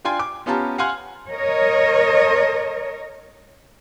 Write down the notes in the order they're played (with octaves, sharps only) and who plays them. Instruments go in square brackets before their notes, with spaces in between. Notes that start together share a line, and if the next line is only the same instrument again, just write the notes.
[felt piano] D4 F4 G5 G#5 C6
D6
B3 C#4 F4 G4 A5 A#5
F5 F#5 G#5 C6 F6
[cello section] A#4 C#5 D#5